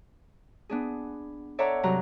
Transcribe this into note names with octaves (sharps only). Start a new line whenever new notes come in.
B3 D4 G#4
A4 C#5 D5 E5 F#5 A#5
G2 C3 F#3 A#5